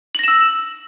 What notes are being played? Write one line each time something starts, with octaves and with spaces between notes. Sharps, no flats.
E6 A#6 E7 F#7